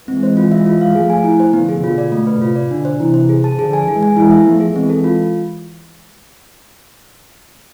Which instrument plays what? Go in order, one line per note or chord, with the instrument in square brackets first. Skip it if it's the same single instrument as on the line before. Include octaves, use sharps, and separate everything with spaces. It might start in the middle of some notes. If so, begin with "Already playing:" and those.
[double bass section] E3 G#3 [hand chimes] C4
[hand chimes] C5
F4
E5
F4
F5
[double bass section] F3 A3 [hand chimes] G#4
[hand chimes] G#5
E4
C5
[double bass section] D3 F3 [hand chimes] B3
[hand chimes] G#4
[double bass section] B2 D3 [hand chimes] F4
[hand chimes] D5
A3
B4
[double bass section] A2 C3 [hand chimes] F4
[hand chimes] D5
[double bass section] B2 D3 [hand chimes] D4
[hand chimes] C5
[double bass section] C3 E3 [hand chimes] E4
[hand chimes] C5
G#4
A5
[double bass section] D3 F3 [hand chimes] G#4
[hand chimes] G#5
[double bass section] E3 G#3 [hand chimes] G#4
[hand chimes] G#5
[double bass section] E3 G#3 [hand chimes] E4
[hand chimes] E5
[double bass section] F3 A3 [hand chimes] B3
[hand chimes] G#4
[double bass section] E3 G#3 [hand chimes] C4
[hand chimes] A4
F4